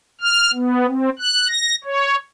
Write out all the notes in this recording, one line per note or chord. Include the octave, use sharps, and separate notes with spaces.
F6
B3
C4
F#6
A#6
C#5